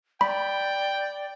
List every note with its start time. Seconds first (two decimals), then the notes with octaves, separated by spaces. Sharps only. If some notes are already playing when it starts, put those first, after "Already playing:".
0.21 D5 G5 B5